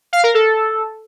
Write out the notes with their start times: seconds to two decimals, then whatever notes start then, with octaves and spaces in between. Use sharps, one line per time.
0.13 F5
0.24 A#4
0.34 A4